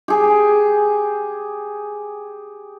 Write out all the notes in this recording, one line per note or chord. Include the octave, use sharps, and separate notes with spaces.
G4 G#4